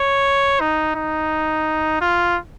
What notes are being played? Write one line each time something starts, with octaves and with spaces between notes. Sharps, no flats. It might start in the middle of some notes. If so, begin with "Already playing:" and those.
Already playing: C#5
D#4
D#4
F4